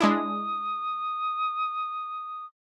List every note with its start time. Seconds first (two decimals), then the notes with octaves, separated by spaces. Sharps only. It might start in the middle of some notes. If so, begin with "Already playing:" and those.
0.01 G#3 D4 E4 D#6